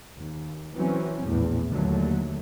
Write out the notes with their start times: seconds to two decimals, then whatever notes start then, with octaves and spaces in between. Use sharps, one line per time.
0.18 D#2
0.75 E3 F#3 C4 C#4
1.24 A#1 E2 A2
1.71 D#2 D3 F#3 A3